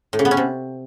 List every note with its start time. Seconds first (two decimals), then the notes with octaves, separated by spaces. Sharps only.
0.13 A2
0.19 C#3
0.25 B3
0.31 C#4
0.37 C3